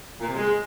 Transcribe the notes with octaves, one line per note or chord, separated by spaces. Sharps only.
A#2
C3
G#3